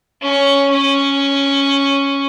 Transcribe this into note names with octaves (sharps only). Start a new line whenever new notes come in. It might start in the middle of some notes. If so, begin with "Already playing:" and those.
C#4
C#4